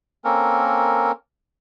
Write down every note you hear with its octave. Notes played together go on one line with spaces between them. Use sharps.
A#3 C4 C#4 A4 A#4